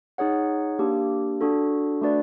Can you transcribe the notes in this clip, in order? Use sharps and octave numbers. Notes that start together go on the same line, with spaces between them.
D#4 G#4 C#5 F#5
A#3 D4 G4
D4 F#4 A4
A3 D4 F#4 B4 D5